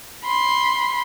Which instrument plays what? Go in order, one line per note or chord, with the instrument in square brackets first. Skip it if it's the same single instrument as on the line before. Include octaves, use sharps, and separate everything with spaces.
[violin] B5 C6